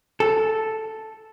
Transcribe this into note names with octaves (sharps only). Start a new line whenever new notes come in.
A4